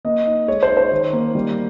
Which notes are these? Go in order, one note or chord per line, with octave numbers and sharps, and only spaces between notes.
A#3 D#5
D#4
G#3 C#5
C5
D#4
C5
D#3
A#3
G3